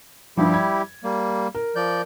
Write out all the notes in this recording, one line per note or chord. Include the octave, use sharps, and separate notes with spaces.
G2 F3 G3 E4 G4
G#6
G3 A#3
A#4
F3 D5 G6